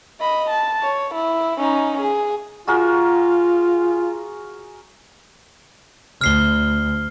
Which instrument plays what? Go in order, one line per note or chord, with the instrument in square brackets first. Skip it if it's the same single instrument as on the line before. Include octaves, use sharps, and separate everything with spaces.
[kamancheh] D#5 B5
A5
C#5
E4
C#4 D#4
G#4
[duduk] F4 [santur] F#4 G#4 A#4
[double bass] D2 [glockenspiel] F6 C7 G7